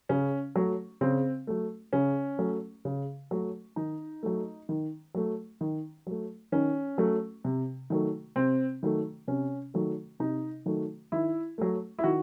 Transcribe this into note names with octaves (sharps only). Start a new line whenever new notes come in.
C#3 C#4
F#3 A3
C#3 C4
F#3 A3
C#3 C#4
F#3 A3
C#3
F#3 A3
D#3 D#4
F#3 A3
D#3
F#3 A3
D#3
F#3 A3
D#3 C#4
F#3 A3
C3
D#3 F#3 A3
C3 C4
D#3 F#3 A3
C3 C#4
D#3 F#3 A3
C3 D#4
D#3 F#3 A3
D#3 E4
F#3 A3
E4
D#3 F#4